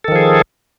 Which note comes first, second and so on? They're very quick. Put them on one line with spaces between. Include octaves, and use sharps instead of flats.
A4 D#3 F3 G#4